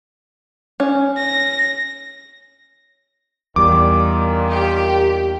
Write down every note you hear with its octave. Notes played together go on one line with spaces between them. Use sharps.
C#4
A#6
E2 A#2 D#3 G3 D6
G4